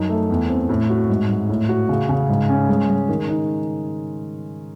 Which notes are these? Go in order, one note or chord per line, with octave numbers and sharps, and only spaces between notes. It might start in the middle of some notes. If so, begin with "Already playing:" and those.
Already playing: F#2 D#4
A3
E2
C4
A2
F#4
G#2
G#2
A2
F#4
C#3
C#3
G#2
C#4
G#3
G#3
D#3
D#4